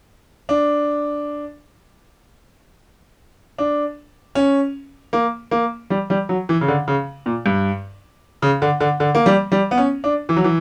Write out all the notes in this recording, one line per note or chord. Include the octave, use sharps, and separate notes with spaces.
D4
D4
C#4
A#3
A#3
G3
G3
F#3
E3
C#3
D3
C#3
A#2
G2
C#3
D3
D3
D3
A#3
G3
G3
B3
C#4
D4
E3
F#3
E3